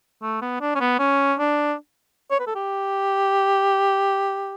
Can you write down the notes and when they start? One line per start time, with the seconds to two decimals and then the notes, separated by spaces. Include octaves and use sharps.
0.22 A3
0.41 B3
0.61 D4
0.75 C#4
0.80 B3
0.99 C#4
1.39 D4
2.31 C#5
2.40 B4
2.47 A4
2.55 G4